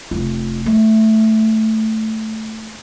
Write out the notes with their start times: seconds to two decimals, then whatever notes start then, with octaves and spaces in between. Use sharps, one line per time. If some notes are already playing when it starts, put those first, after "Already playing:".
0.11 F1 F4
0.66 A3